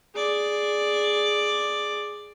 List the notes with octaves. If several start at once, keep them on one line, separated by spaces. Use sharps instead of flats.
G#4 D5